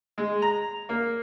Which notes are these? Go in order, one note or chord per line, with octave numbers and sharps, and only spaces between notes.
G#3
A#5
A#3